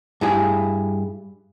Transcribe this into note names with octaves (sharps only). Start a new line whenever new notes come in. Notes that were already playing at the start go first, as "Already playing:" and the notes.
G2 E4 G#4